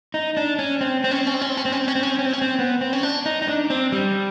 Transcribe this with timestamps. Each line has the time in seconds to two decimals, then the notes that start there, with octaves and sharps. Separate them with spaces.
0.14 D#4
0.37 D4
0.59 C#4
0.81 C4
1.04 C4
1.11 C#4
1.19 C4
1.27 C#4
1.34 C4
1.42 C#4
1.49 C4
1.57 C#4
1.65 C4
1.72 C#4
1.80 C4
1.88 C#4
1.95 C4
2.03 C#4
2.10 C4
2.19 C#4
2.26 C4
2.33 C#4
2.41 C4
2.59 B3
2.81 C4
2.93 C#4
3.03 D4
3.26 D#4
3.42 D#4
3.48 D4
3.70 C4
3.92 G3